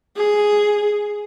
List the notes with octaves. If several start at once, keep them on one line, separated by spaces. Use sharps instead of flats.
G#4